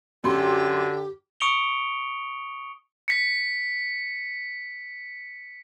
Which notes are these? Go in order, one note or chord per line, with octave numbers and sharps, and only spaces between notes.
F#2 D3 G4 C6
C#6 D#6 C#7 D7 F7 G7
B6 C#7